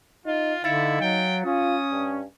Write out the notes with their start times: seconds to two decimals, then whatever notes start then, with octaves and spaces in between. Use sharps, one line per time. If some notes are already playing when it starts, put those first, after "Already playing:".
0.26 D#4 F4
0.64 D3 D#4 E4 F5 A6 C#7
1.01 F#3 G5
1.45 C#4 F4 D#6
1.92 G2